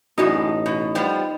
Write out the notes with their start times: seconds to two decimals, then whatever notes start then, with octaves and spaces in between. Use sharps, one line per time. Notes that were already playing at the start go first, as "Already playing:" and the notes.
0.18 A1 F#2 A2 G#3 D#4 F#4 D5
0.66 B2
0.95 F3 G3 B3